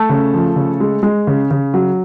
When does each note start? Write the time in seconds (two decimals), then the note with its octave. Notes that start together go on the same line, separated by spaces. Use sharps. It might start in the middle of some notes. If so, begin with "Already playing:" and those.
Already playing: A3 A4
0.09 C#3
0.34 F3
0.56 C#3
0.80 G#3
1.03 G#3
1.27 C#3
1.51 C#3
1.74 F#3